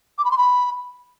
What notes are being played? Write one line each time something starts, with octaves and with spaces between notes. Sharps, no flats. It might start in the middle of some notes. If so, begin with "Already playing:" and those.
D6
B5
C6
B5